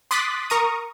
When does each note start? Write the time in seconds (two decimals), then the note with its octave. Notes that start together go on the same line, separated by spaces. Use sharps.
0.11 C6 D6 D#6 F#6 A6 B6
0.50 A#4 A#5 C#6 D#6